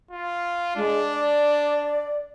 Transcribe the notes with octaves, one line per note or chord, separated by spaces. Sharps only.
F4
G#3 D4
D5